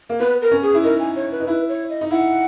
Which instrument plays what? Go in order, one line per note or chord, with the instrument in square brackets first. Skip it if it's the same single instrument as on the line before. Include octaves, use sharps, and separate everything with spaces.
[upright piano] A#3
[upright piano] B3 [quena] B4
[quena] A#4
[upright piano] C#4
[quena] G#4
[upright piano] E4
[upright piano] D#4 [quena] A#4
[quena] G#5
C#5
B4
[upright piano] D#4
[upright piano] E4 [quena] B4
[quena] C#5
D#5
[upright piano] D#4
[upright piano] E4 [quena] F#5